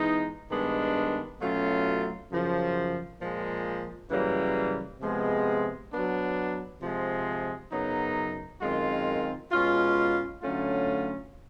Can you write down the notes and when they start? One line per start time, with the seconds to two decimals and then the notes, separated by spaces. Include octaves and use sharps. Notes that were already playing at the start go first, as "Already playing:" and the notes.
Already playing: E3 G#3 B3 D#4
0.50 G2 D#3 G#3 B3 D4
1.40 B2 F#3 A3 C#4 F4
2.30 F#2 C#3 F3
3.20 A#2 F3 G#3
4.10 F#2 C#3 E3 G3 A#3
5.00 C3 F3 G#3 B3
5.91 F#3 B3 D4
6.81 C3 F3 G#3
7.71 F#2 C#3 F#3 B3 D#4
8.61 F#2 D#3 G#3 C4 F4
9.51 B2 G#3 C#4 F4
10.42 D3 F#3 A3 C#4 F4